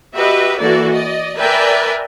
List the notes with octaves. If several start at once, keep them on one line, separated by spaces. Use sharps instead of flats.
F#4 G4 B4 D#5 E5
E3 A#3 E4 F#4 A4 D5
D5 D#5
A#4 B4 D5 E5 G5 G#5